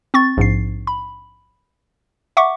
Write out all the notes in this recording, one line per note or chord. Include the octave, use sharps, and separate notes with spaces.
C4 C#6 A6
A#1 G#2 C7
B5
E5 F#5 C#6 D6